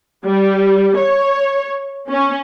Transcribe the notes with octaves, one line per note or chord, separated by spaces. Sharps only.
G3
C#5
C#4